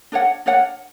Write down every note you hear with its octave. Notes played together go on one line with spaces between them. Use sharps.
D4 A#4 C#5 F#5
D4 A#4 C#5 F#5